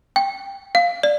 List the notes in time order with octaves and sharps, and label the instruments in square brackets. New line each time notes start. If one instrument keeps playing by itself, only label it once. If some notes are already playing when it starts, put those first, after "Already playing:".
[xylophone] G5
F5
D5